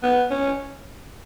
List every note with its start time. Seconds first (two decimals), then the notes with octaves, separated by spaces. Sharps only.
0.03 B3
0.31 C#4